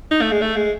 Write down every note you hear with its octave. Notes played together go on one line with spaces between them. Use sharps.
D#4
A3
G#3
A3
G#3